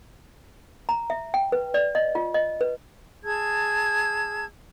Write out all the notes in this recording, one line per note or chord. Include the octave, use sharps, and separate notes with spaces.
A#5
E5
G5
B4
D5
D#5
F4
D#5
B4
G#4 A5 E6 G#6